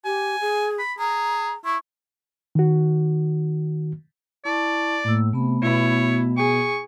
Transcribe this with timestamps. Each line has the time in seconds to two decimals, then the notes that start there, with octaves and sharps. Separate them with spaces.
0.05 G4 G#5
0.41 G#4
0.79 B5
0.99 G#4 A#5
1.65 E4 C#6
2.55 D#3 F#4
4.45 E4 D5 A5 C#6
5.04 A2 A#3 E6
5.33 C3 A3 B3 B5
5.63 B2 E4 C#5
6.38 G#4 C#6